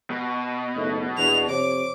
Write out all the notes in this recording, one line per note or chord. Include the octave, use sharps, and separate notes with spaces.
B2
F#1 A3 D#4
E2 D4 F7
F2 C3 C5 C#5 D6